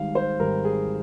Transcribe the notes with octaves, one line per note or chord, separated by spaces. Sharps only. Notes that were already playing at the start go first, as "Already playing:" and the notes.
Already playing: G#1 G#2 G3 F5
C5
G#1 G#2 G3 A#4
G#4